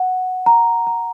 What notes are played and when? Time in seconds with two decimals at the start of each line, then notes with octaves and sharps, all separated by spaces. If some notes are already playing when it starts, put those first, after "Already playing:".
Already playing: F#5
0.46 A#5
0.87 A#5